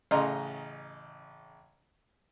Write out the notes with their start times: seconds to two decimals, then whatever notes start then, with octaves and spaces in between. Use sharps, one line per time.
0.11 A1 C#3 D#5 A#5 C6